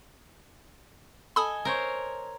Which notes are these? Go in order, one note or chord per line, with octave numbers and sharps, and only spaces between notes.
A4 D#5 G#5 B5 D#6
A#4 C5 C#5